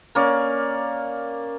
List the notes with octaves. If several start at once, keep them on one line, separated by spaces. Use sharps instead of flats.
A#3 C#4 D5